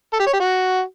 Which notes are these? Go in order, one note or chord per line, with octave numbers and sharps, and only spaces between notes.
A4
G4
C#5
G4
F#4